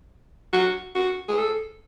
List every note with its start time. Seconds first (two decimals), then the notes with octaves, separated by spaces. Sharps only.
0.53 F#4
0.95 F#4
1.28 G#4
1.38 A4